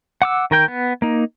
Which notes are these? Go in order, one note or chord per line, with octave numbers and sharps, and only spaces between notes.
F#5 D6 E6
D#3 A#4 G5 G6
B3
A#3 D#4